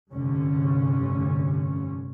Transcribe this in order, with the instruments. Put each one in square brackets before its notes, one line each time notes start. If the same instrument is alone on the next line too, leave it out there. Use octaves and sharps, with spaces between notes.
[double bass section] F1 G2 D3 C#4